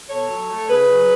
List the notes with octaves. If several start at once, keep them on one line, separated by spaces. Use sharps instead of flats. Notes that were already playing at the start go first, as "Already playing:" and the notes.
B2 A4 C#5
F#3
A3
C#3 G#4 B4
F#3